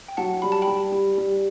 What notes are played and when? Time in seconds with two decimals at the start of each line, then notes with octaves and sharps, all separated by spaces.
0.08 G5
0.17 F#3 F#5 A5
0.42 G3 B5
0.52 A5
0.62 G5 B5
0.67 G3
0.92 G3
1.18 G3